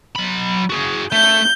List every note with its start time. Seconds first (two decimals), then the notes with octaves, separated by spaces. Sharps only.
0.15 F#3 B5
0.70 F#4 G#4
1.12 A3 G6